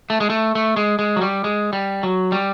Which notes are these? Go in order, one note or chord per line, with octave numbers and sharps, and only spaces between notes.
A3
G#3
A3
A3
G#3
G#3
F#3
G3
G#3
G3
F#3
G3